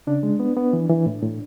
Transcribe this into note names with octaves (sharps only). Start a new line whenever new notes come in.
C#3 D4
G#3
B3
B3
E3
E3
A2
A2